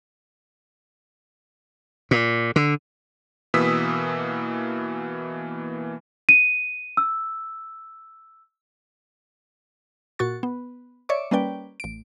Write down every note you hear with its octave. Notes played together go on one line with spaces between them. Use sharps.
A#2
D3
B2 E3 A#3 D#6 E6 B6
D#7
E6
A#2 F#4 C#6 A6
B3
C#5 D5 E5 C#6 D6
G3 A#3 C#4 B4 D5 G5
A1 D7